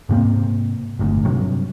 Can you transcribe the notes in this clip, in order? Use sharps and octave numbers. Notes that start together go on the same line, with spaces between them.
G#2 C3 A#3 C4
D1 G1 D2
G2 C3 F#3